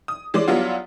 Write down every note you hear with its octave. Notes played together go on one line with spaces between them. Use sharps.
D#6
E3 G#3 C#4 D5
F#3 G3 B3 D4 E4 F4